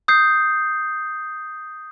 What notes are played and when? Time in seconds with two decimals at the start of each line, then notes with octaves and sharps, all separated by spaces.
0.08 D#6 G6 C7